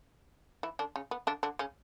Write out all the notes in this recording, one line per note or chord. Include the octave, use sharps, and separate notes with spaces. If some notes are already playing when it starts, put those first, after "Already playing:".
E3 E4
D3 D4
C#3 C#4
B3
D3 D4
D3 D4
C#3 C#4